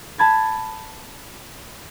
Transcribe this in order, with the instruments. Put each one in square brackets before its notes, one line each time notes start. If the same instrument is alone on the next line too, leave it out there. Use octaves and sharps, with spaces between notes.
[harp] A5 B5 G#6 A6